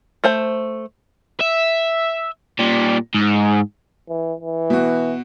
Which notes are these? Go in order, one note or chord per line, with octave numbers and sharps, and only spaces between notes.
A3 C5 A5
E5
A#2 G3
G#2
E3
E3
B2 F#4